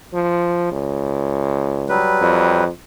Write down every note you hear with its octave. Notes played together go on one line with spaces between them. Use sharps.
F3
C#2
F#3 G3 B4
F2